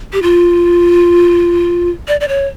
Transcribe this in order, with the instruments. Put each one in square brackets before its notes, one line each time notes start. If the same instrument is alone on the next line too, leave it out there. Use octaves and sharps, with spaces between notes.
[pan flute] G4
F4
D5
D5
C#5